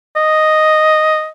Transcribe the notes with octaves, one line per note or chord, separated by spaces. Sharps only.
D#5